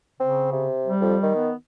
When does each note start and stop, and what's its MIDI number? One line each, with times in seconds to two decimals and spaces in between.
0.20 0.68 49
0.20 0.48 60
0.53 0.93 48
0.86 1.33 55
1.01 1.16 41
1.23 1.50 51
1.36 1.55 59